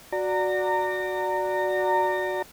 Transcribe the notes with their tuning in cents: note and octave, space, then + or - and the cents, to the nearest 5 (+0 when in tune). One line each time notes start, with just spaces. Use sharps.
F#4 -5 D5 +0 A#5 -25